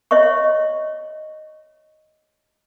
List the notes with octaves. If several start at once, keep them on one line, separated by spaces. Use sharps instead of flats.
C#5 D#5 E5 C#6